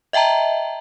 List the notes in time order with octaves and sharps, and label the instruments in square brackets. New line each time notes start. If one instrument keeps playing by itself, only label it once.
[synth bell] D#5 E5 G5 A5 A#5